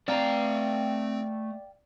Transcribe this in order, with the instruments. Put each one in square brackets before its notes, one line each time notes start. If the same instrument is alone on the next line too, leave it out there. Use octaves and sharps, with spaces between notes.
[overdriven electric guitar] A3 A#5 [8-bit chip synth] C4 [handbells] D5 [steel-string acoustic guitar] F5 G5